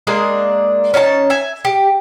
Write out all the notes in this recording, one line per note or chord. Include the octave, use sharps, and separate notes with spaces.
G#3 A#3 D4 G#4
C#4 D#4 F5 A5
E5 G#5
G4